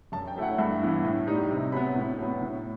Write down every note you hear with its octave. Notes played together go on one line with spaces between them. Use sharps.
F#2 A5
G5
F#3 A3 E4 E5 F#5
G2 B5
E3 B3 E4
A2
G3 D#4
C3
F#3 B3 B5
A2
F#3 B3
A2